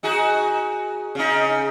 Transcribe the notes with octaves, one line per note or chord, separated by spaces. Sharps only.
D#4 F#4 G#4
C#3 D#4